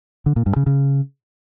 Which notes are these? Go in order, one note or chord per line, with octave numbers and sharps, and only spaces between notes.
D3
A#2
G2
C#3
C#3